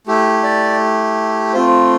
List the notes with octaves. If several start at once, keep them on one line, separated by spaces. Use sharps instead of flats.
A3 E4 G4
D5
A3 C4 F4 C5